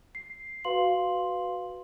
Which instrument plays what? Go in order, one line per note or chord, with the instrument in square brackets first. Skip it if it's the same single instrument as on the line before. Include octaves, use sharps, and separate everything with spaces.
[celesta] C7
F#4 B4 F5 C6 F#7